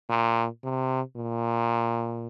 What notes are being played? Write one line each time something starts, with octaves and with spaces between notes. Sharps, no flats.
A#2
C3
A#2